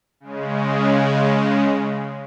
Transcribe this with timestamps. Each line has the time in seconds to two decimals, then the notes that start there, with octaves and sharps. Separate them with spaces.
0.20 C#3 G#3